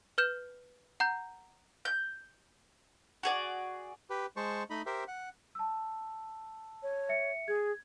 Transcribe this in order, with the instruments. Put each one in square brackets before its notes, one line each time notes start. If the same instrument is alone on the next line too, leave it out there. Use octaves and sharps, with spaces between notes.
[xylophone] B4 F6 G6 E7
F#5 A#5 G6
[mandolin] G6
F#4 G#4 D5
[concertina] G4 B4
G#3 C5 A5 C#6
A3 D#4 D#5 B5
G4 A#4 C5 E5
F#5
[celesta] A5 E6
[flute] C#5
[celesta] E5 C#7
[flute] G#4 [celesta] G#6